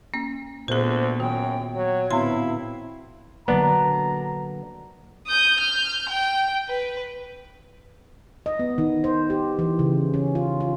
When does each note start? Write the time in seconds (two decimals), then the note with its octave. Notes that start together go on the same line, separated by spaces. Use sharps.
0.14 A#3 C#4
0.68 D2 A#2 B3 G#4 A#4 C5
1.20 F#2 D#3 G5
1.75 F#3 C#5
2.11 A2 D3 B3 C4 E4 F5 C6
3.48 D3 F#3 A#3 B3 D4 A#5
5.27 D#6 G6
5.60 F6 G6
6.09 G5
6.68 B4
8.46 D#5
8.59 B3
8.78 D#3
9.04 C5
9.30 G4
9.59 E3
9.79 C#3
10.14 C#4
10.35 F4
10.60 F4